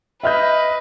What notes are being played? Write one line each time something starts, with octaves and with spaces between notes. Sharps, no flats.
B4 D#5 E5 F6 G6